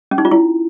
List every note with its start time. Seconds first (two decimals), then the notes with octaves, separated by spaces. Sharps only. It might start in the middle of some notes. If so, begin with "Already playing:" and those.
0.11 C#4
0.18 D#4
0.25 F4
0.31 E4